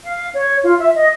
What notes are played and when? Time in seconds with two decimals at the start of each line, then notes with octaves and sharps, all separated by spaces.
0.03 F5
0.34 C#5
0.64 F4
0.78 E5
0.95 D#5